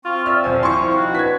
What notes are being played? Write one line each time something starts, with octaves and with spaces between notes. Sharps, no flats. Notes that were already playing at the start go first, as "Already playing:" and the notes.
C4 F4 C#6
D5 E5 F6
D#1 F3 C5 G#5
E4 C6 C#6
D#4 F#4
D4 B4 C#5 G#6 B6